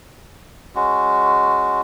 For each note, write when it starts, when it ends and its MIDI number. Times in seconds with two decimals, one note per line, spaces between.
0.76 1.81 56
0.76 1.81 61
0.76 1.81 66